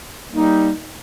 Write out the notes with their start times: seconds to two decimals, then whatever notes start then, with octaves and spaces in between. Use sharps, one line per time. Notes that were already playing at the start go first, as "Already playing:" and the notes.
0.32 G3 A#3 D#4